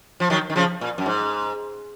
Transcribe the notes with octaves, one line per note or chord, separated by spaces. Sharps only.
F3
D#3 F#3
D#3
C#3 F3
A#2
F#2
G#2